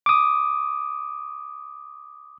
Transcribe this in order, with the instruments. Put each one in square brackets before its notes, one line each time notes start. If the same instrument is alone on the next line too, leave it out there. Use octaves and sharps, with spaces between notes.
[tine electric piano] D6 D#6